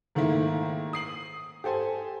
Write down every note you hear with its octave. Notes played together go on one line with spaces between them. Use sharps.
G#2 D#3 A3 A#3 E4
D#6 C7 F#7
G4 A4 C5 G#5